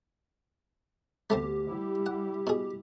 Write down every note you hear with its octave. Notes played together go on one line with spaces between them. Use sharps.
D2 A3 B3 C4 G4
G3 E4
F#5
B2 G#4